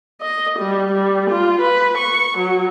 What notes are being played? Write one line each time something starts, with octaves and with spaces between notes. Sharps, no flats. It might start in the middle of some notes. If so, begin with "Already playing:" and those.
D#5
G3
G3
F4
B4
C#6
F#3